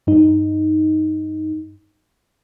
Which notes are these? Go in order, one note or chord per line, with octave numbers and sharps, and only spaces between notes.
G2 D#4